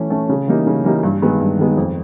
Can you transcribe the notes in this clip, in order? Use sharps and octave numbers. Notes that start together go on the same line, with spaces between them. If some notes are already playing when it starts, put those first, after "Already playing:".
Already playing: E3 A3 C#4
A3 C#4
C#3
E3 G3 A#3 D#4
C#3
E3 G3 A#3 D#4
G2
D#3 G#3 B3
G2
D#3 G#3 B3
F2